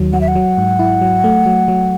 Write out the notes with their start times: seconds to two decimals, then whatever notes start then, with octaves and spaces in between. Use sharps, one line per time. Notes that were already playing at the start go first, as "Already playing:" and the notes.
Already playing: D#2 D#3 F#3
0.13 F#3 F#5
0.21 E5
0.28 F#5
0.35 F#3
0.58 G#2
0.79 E4
1.01 F#3
1.24 A3
1.46 F#3
1.68 F#3